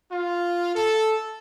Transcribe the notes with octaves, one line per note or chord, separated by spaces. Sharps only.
F4
A4